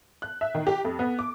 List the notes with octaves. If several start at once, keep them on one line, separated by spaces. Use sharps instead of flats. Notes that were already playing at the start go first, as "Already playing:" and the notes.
F#6
E5
D#3
G4
F2
B3
D6